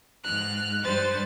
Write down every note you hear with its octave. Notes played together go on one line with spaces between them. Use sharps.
G#2 F6 F#6
G2 B4 C5 A6